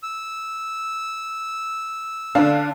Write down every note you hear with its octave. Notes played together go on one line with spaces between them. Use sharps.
E6
D3 D4 F5